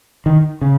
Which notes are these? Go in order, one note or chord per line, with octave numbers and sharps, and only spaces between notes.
D#3
C#3